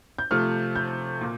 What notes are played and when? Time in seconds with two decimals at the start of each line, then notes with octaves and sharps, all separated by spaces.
0.18 G6
0.31 C3 F3 A3 F6
0.76 G6
1.21 A#2